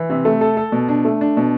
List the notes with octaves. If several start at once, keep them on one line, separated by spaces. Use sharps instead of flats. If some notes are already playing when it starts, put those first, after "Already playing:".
Already playing: E3
C3
A3
A4
A4
B2
D4
A3
D4
B2